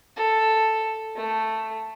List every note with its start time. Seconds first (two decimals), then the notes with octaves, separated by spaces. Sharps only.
0.17 A4
1.16 A3